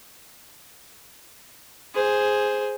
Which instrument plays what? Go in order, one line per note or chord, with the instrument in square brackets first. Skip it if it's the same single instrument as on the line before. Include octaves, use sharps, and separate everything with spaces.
[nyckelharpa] G#4 C5